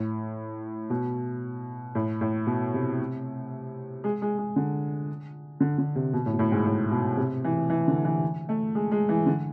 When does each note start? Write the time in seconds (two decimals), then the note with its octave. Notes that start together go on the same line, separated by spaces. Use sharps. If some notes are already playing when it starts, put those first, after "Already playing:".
Already playing: A2
0.90 B2
1.95 A2
2.21 A2
2.47 B2
2.74 C3
4.04 G#3
4.22 G#3
4.38 G#3
4.56 D3
5.60 D3
5.78 D3
5.95 C3
6.13 B2
6.26 A2
6.33 B2
6.39 A2
6.52 G#2
6.66 A2
6.92 B2
7.17 C3
7.44 E3
7.70 E3
7.88 D3
8.05 E3
8.49 A3
8.75 G#3
8.91 G#3
9.09 E3
9.26 D3